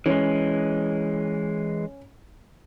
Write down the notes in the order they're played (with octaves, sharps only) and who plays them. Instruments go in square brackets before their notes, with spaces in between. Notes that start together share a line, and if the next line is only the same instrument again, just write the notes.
[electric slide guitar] E3 G#3 [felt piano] C#4